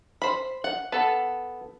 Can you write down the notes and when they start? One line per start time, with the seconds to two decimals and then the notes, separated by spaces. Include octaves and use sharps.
0.22 C5 B5
0.64 F#5
0.92 B3 A4 A5